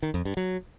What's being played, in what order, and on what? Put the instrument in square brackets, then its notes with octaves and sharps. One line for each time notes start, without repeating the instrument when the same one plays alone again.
[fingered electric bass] D#3
F2
G2
F#3